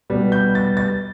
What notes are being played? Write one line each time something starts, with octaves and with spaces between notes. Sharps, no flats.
B2 G3 B3
G6
A6
A6